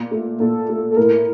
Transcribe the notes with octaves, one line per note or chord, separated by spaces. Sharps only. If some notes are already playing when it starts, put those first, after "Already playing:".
Already playing: A#2
A3
A#2 A4
A3
A4
A2 A#4